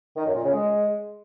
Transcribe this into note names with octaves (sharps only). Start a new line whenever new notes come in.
D#3
F#2
A#2
C#3
G#3